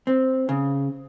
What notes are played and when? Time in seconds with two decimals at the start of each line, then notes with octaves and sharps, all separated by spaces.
0.07 C4
0.49 C#3